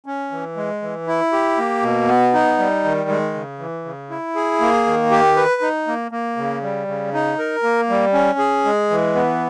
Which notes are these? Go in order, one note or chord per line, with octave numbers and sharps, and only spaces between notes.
C#4
E3
G#3
E3
E4
G4
A#3
B2
B3
D#4
G3
D#3
G#3
C#3
E3
C#3
E4
G#4
A#3
D#3
G4
B4
D#4
A#3
A#3
C#3
G3
C#3
D#4
A#4
A#3
G3
C#4
G#4
G#3
E3
B3